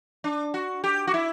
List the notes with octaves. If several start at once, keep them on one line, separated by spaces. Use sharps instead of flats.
D4
F#4
G4
F#4
E4